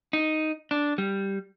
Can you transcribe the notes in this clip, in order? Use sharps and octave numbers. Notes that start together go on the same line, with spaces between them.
D#4
D4
G3